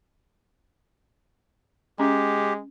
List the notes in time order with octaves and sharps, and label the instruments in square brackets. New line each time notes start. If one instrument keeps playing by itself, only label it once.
[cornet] G#3 [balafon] C#4 [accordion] G4